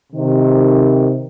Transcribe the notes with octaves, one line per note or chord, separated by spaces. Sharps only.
C3 D#3